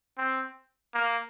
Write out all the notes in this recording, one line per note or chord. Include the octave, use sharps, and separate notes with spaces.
C4
A#3